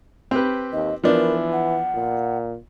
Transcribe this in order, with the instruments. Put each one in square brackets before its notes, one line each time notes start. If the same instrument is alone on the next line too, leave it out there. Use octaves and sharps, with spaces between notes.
[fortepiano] C4 G4 B4
[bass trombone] D#2 [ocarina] D#5
[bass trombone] E3 [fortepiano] F3 B3 D4 [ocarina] A#4
[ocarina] F#5
[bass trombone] A#2